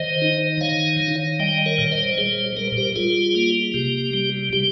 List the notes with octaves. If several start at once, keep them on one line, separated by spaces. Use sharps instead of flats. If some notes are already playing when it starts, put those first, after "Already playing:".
Already playing: D#3 C5 D#5
D#4
D#3 C#5 F5
D#3
G3 D#5 G5
A#4 C#5
A#2
C5 D#5
C#5
G3 G#4 C5
G3 A#4
C5
G4 A#4
G3 F4 G#4
A#3
C3 G4
G3
G3 G4